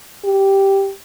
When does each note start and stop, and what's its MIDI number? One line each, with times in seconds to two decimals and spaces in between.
0.24 0.91 67